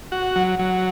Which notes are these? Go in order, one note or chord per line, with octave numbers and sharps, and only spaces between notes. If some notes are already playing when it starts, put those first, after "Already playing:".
F#4
F#3
F#3